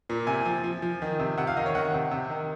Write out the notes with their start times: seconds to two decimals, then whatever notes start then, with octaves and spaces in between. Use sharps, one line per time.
0.09 A#2
0.27 C3 G#5
0.45 F3
0.64 F3
0.82 F3
1.02 D#3
1.19 C3
1.37 C3 F#5
1.47 F5
1.57 D#3 D#5
1.66 C#5
1.75 D#3 F#5
1.94 C3
2.11 C3
2.30 D#3